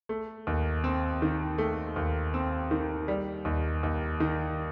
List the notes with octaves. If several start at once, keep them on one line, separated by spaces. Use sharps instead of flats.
A3
D#2
C4
D#3
A3
D#2
C4
D#3
G3
D#2
D#2
D#3